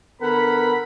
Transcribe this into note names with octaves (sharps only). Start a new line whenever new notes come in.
D3 B3 A#4 F#5 B5